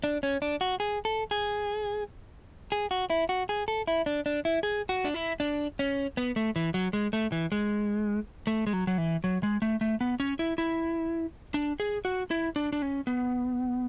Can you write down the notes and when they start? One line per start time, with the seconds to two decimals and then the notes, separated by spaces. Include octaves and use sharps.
0.04 D4
0.23 C#4
0.42 D4
0.61 F#4
0.80 G#4
1.05 A4
1.31 G#4
2.72 G#4
2.91 F#4
3.10 E4
3.29 F#4
3.49 G#4
3.68 A4
3.87 E4
4.06 D4
4.26 D4
4.45 E4
4.63 G#4
4.89 F#4
5.05 D4
5.14 E4
5.40 D4
5.79 C#4
6.17 B3
6.36 A3
6.56 E3
6.74 F#3
6.93 G#3
7.13 A3
7.32 E3
7.52 G#3
8.47 A3
8.67 G#3
8.73 F#3
8.87 F#3
8.98 E3
9.24 F#3
9.43 G#3
9.62 A3
9.81 A3
10.01 B3
10.20 C#4
10.39 E4
10.58 E4
11.54 D4
11.80 G#4
12.05 F#4
12.31 E4
12.56 D4
12.73 D4
12.82 C#4
13.07 B3